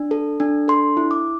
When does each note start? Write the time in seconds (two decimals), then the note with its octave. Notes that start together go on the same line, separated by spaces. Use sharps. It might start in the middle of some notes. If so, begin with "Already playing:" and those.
Already playing: D4
0.11 A4
0.40 D4
0.68 A4 C6
0.97 E4
1.11 D6